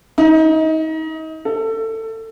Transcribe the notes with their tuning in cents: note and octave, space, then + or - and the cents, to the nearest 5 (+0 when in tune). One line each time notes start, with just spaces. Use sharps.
D#4 +30
A4 +25